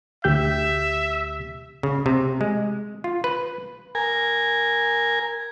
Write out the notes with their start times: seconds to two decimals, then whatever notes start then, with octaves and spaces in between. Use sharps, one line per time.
0.24 D2 G4 E5 G6
1.83 C#3
2.06 C3
2.41 G#3
3.04 F4
3.24 B4
3.95 A#4 G#5